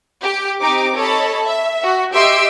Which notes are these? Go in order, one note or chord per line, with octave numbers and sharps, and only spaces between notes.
G4
C4 D#4 G4 D6
A4 C#5 D#5 A5 B5
E5
F#4
G4 D#5 E5 C6 E6 D7